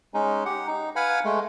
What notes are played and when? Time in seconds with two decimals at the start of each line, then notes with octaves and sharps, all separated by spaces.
0.14 G#3 C#4 D#4
0.46 G4 F#5
0.67 D#4
0.96 B4 F5 F#5 G#5 B5
1.25 G#3 A3